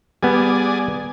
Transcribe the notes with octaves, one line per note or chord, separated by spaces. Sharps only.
G3 B3 G#4 D5 G#5